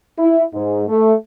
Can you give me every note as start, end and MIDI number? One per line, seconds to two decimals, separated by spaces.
0.19 0.43 64
0.54 0.84 44
0.89 1.14 57